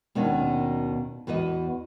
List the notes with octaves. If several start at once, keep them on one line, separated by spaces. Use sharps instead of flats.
D#2 B2 D#3 C#4 D4
E2 F#4 B4 D#5